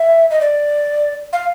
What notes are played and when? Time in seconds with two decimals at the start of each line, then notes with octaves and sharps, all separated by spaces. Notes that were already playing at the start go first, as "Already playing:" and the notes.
Already playing: E5
0.31 D#5
0.41 D5
1.33 F5